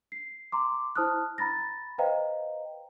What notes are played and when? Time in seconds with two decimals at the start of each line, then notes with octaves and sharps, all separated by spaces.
0.12 C7
0.52 A#5 C6 D6
0.96 E4 C5 A5 D#6 F6 F#6
1.38 A#5 B5 A6 A#6
1.98 B4 C5 D#5 F5 G5 A#5